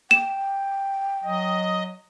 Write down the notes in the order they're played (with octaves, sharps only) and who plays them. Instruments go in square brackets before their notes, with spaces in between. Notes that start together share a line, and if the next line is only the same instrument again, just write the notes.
[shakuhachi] G5 [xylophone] E7
[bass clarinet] F#3 [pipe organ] D#5